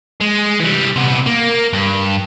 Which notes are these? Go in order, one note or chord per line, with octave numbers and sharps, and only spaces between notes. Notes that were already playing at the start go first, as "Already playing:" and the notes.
G#3
E3 G3
C3 B3
A#3
G2